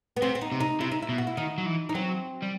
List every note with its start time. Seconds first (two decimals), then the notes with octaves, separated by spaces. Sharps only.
0.17 B3
0.22 C3 C4
0.35 C4
0.41 D#4
0.52 C3
0.60 D#4
0.80 C3 E4
0.91 D#4
1.02 E4
1.09 B2
1.18 F#4
1.27 E4
1.37 D#3 D#4
1.58 F#3
1.66 E3
1.89 D#4
1.95 F#3 C4
2.43 G3